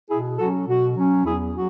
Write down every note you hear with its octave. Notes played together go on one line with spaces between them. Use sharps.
B2 E4 G#4
F#3 C#4 F#4 A4
B2 F#4
F#3 C#4
E2 E4 G#4
F#3 F#4